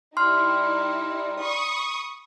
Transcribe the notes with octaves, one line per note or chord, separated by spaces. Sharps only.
G3 D#4 E4 C6 F6
B5 C#6 D#6